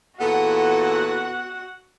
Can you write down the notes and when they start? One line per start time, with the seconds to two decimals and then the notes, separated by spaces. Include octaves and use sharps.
0.20 E2 A#2 B3 F#4 A4 F#5